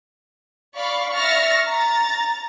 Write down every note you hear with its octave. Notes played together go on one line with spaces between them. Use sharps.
D5 F5 B5 C#6
E5 C#6 F6 A6 A#6
A#5 A6